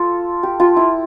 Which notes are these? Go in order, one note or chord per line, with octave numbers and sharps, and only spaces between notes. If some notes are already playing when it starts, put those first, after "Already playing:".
Already playing: F4 A4
G4
F4
E4